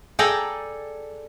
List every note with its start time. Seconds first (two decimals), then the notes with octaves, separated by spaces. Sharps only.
0.19 G#4 A4 D5 G5 A#5